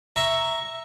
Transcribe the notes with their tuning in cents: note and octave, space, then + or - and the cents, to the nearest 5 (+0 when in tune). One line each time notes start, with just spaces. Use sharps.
E5 +0 A#5 +0 C#6 +0